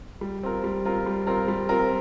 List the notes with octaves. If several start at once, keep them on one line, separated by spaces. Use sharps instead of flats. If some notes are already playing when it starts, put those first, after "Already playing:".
G3
C4 F4 A#4
G3
C4 F4 A#4
G3
C4 F4 A#4
G3
C4 F4 A#4